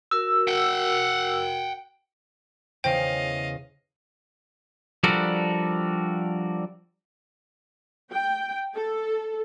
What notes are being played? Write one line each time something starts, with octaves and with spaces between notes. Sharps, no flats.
F#4 A#4 E6
F#5 G5
E2 C#3 C5 D#5 F5 G5
F3 G3 D4 F#4 A4 A#4
G5
A4